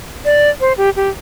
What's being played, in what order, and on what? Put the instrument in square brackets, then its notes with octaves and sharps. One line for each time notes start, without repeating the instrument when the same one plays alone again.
[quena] D5
C5
G4
G4